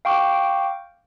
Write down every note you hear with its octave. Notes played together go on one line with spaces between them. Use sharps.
F5 G5 C#6 D6